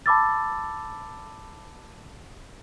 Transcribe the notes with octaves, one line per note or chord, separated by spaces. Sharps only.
A5 B5 D6 E6 A6